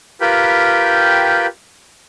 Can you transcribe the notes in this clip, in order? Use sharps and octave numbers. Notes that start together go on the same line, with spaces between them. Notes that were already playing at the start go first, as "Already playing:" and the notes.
F4 G4 A#4 B4 G5 B5